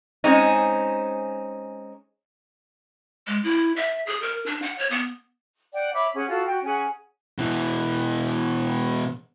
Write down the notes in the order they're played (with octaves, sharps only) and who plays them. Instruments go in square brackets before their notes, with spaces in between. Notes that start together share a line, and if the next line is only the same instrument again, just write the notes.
[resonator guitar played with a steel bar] G#3 C4 C#4 D#4
[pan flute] G#3
E4
E5
G#4
A#4
D4
F#5
C#5
B3
[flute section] D5 F#5 G5
C#5 E5 B5 D6
C#4 G#4 F#5
F4 F#4 A4
F#4 G5
C#4 G#4 F#5 G#5
[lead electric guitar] B2 E3